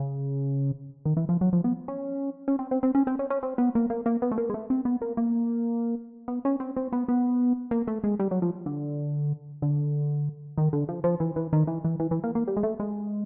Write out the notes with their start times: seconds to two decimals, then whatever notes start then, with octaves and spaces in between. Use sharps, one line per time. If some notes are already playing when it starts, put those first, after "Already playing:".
Already playing: C#3
1.05 D#3
1.17 E3
1.29 F3
1.41 F#3
1.53 F3
1.64 B3
1.88 C#4
2.48 C#4
2.59 C4
2.71 C4
2.83 C4
2.95 C#4
3.07 C4
3.19 C#4
3.30 C#4
3.43 C4
3.58 B3
3.75 A#3
3.90 A#3
4.06 A#3
4.22 B3
4.32 A3
4.38 A#3
4.50 G#3
4.54 A3
4.70 C4
4.85 B3
5.02 A#3
5.17 A#3
6.28 B3
6.45 C#4
6.60 C4
6.77 C4
6.92 B3
7.08 B3
7.71 A#3
7.87 A3
8.04 G#3
8.20 G3
8.31 F#3
8.42 F3
8.66 D3
9.62 D3
10.58 D#3
10.73 D3
10.89 F3
11.04 F3
11.20 E3
11.36 E3
11.53 D#3
11.67 E3
11.84 E3
12.00 E3
12.11 E3
12.24 A#3
12.35 A#3
12.48 G3
12.57 G#3
12.63 A3
12.80 G#3